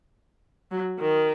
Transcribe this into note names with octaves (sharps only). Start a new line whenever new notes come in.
F#3
D#3